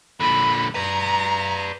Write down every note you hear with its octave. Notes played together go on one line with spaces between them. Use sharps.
A#2 D3 B5
B4 D5 A#5